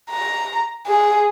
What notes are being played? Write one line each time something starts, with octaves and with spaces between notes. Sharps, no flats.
A#5
G#4